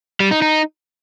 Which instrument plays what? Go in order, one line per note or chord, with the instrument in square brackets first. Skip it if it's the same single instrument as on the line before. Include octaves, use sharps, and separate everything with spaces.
[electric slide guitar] G3
D#4
D#4